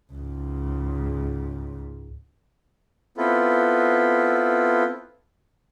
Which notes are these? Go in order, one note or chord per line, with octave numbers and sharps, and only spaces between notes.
C#2 G#2
B3 C4 E4 F4 A4 B4